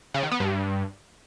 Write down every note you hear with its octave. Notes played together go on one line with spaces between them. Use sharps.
C#3
D#3
B3
G2